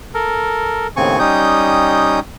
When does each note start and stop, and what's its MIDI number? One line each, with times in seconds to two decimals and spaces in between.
0.14 0.88 69
0.14 0.88 70
0.97 1.19 39
0.97 1.19 45
0.97 1.19 49
0.97 1.19 60
0.97 1.19 80
0.97 1.19 85
1.19 2.20 55
1.19 2.20 61
1.19 2.20 63
1.19 2.20 79
1.19 2.20 87
1.19 2.20 91